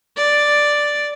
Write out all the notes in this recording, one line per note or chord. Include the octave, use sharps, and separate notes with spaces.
D5